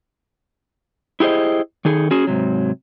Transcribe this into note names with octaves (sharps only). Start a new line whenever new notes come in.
E4 G4 G#4 C5 D#5
D#3 D#4 G#4 A4
C#4 F#4 G#4
G#2 C3 F#3